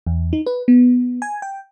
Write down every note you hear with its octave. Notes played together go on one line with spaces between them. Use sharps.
E2
D#4
B4
B3
G#5
G5